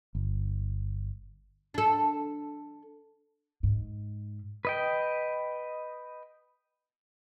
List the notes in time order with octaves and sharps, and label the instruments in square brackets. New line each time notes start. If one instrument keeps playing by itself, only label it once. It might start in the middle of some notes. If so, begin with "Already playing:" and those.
[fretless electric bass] G1
[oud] D4 A4
[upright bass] G#2
[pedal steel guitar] B4 D#5 G5